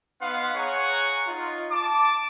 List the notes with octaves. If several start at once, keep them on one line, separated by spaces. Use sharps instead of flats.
B3 D#4 F5 F#5 C6
G#4 C#5 F#5 A#5 C#6
D#4 F4
A5 D6